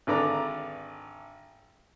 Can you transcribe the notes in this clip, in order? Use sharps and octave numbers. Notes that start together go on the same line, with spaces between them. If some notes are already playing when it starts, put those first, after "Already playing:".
G#1 D3 B4 D5 A#5